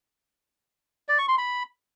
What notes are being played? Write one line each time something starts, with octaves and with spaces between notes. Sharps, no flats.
D5
C#6
C6
B5